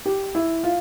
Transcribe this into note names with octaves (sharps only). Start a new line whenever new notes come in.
G4
E4
F4